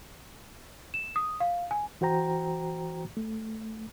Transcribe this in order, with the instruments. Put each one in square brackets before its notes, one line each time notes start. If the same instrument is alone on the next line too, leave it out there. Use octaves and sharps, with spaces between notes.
[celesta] E7
D#6
F5
G#5
[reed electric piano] E3 F#4 C5 G5 A#5
A3